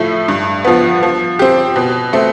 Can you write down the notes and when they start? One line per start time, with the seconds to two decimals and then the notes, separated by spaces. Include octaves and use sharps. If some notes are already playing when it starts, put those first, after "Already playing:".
Already playing: A2 F3 A3 E4
0.28 G2
0.65 F3 B3
1.03 F3
1.39 C4 G4
1.76 B2
2.13 A3 C4